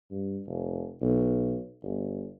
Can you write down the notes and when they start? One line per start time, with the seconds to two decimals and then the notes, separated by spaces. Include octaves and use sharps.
0.11 G2
0.46 F1
1.02 B1
1.83 G1